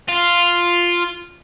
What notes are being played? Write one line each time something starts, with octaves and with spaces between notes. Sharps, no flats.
F4